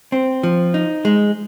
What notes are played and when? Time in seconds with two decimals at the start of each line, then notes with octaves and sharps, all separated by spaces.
0.12 C4
0.43 F3
0.74 D#4
1.05 G#3